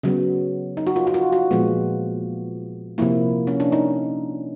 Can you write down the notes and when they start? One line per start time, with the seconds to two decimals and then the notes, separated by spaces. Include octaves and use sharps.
0.03 C#3 F#3 B3
0.77 D#4
0.87 F#4
0.96 F4
1.07 F#4
1.14 F4
1.33 F#4
1.51 A#2 F3 G#3 B3
2.98 C3 F3 A#3 E4
3.47 C#4
3.60 D4
3.72 D#4